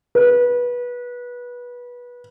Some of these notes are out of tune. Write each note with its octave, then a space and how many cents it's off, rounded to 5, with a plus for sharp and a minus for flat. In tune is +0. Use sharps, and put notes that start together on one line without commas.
B4 -20